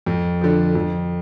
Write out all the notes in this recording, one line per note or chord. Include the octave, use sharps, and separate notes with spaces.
F2
D3 F3
F2